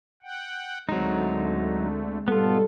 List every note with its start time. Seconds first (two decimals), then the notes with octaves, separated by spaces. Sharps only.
0.23 F#5 G5
0.89 D2 D3 F#3 G#3 A3 C4 D#4
2.28 G#2 B2 G3 B3 F4 A4